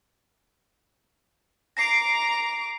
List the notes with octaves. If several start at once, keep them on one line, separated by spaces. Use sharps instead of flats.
A#5 D6 A#6 C7 D7